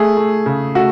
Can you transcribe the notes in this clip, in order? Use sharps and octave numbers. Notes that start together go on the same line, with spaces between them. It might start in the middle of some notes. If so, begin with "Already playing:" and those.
Already playing: A3 G#4
A3
C#3
A3 F#4